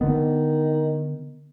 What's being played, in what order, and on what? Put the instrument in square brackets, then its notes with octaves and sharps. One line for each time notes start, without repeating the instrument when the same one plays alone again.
[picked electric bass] D3 B3 [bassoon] D#3